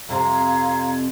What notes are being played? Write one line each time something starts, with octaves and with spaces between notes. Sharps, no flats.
F2 C3 F5 A#5 C6 G#6